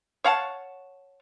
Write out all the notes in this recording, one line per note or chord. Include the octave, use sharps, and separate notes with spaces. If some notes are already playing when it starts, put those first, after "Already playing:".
C#5 F5 F#5 A5